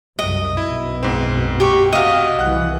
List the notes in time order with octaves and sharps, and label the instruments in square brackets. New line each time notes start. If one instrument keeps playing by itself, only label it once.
[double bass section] C2 F#2 [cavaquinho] D#5
[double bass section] B1 F#2 B2 [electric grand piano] E4
[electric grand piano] G#2 C4
[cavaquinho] G4 C#6
[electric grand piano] C3 F#4 [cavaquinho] D#5 F5
[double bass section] C2 E3 [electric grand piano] F#5 F#6